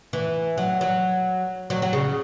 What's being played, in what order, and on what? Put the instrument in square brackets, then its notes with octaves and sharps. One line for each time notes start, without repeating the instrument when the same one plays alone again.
[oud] E3
F#3
F#3
F#3
F#3
C#3